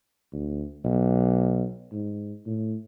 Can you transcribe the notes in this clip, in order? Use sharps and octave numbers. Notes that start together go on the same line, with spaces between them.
D2
B1
G#2
A2